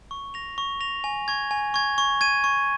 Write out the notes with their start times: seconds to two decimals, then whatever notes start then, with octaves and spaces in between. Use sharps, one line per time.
0.11 C#6
0.34 A#6 F7
0.58 C#6
0.81 A#6 F7
1.04 G#5
1.28 C#6 G#6
1.51 G#5
1.74 C#6 G#6
1.98 C#6
2.21 G#6 D#7
2.44 C#6